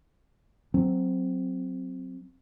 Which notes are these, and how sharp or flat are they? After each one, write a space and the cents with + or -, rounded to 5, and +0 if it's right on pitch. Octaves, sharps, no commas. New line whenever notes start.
F#3 +0 C4 +0